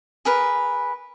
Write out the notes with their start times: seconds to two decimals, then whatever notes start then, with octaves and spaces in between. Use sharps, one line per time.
0.25 G#4 A#4 B4